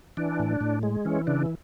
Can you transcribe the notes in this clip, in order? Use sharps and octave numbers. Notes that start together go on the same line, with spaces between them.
E3 D4
A2
A2
G#3
E3 C#4
C#3 D4